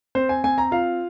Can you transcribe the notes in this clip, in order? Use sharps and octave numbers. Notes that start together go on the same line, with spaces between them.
C4 C5
G#5
C4 G#5
A#5
F4 F5